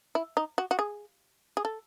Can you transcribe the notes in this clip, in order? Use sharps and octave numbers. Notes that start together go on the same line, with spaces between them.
E4
D#4
F#4
F#4
G#4
G#4
A4